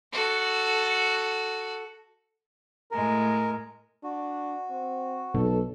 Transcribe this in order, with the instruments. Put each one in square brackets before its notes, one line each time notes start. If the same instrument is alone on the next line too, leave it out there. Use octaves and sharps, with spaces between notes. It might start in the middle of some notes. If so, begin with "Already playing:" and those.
[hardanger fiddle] F#4 A4
[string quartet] A2 G#3 [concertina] A#4
[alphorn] D4 [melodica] F#4
[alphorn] C4
[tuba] B1 [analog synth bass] B2 [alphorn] A4